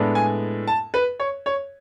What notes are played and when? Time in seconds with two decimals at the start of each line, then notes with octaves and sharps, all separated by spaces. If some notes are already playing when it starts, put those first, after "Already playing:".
Already playing: A2 G#3 B3 D4
0.15 G#5
0.68 A5
0.94 B4
1.20 C#5
1.46 C#5